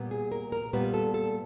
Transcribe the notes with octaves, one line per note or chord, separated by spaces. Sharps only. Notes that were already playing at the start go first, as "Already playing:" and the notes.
Already playing: A#2 G3 B3
G#4
A#4
A#4
A#2 G3 B3 B4
A4
A4